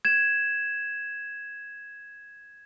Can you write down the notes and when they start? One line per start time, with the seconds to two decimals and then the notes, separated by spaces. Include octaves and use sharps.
0.05 G#6 E7